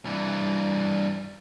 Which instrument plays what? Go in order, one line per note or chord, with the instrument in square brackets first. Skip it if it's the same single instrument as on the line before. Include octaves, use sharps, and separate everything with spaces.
[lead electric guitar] G2 E3